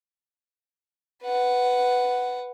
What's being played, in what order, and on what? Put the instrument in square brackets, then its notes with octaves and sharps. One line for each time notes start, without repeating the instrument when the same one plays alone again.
[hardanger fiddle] B4 F#5